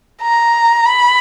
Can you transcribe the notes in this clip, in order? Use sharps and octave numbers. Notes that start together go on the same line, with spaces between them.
A#5
B5